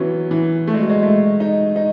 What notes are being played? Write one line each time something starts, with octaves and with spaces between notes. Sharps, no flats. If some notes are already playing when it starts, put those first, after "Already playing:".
Already playing: E3 F#3 B3 C#4
E3
A3
G#3
F#3
G#3
A3
D#4
D#4